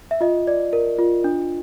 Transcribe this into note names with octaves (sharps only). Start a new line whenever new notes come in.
E5
F4 D#5
D5
A#4
F4
D4